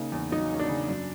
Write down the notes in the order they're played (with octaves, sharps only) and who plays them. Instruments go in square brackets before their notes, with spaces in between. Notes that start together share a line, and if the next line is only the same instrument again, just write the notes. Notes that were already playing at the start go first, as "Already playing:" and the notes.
Already playing: [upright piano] C#3 A#3 D#4
E2
F#3 D#4
A#3 C#4
D4
C#3
F#2